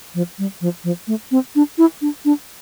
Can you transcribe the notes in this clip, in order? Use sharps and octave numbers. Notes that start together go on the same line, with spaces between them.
F3
G3
F3
F3
A3
C4
D4
E4
D4
D4